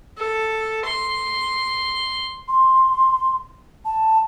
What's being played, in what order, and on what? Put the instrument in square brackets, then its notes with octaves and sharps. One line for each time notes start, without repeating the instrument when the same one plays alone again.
[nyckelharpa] A4
C6
[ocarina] C6
A5